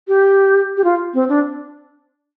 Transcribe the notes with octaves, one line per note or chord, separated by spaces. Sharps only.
G4
G4
F4
C4
D4